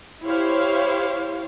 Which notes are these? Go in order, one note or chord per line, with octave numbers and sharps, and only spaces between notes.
E4 G4 C5 C#5 F5